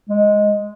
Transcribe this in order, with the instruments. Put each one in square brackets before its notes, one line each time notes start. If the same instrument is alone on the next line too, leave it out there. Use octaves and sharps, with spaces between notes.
[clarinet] G#3